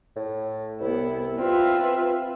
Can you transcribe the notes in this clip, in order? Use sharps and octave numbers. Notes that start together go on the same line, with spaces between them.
A2
C2 B3 E4
C4 F4 B4 E5